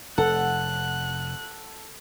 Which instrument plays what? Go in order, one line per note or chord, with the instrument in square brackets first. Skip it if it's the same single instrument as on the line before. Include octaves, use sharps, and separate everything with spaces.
[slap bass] F1 [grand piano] A4 [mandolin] F#5 [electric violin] F#6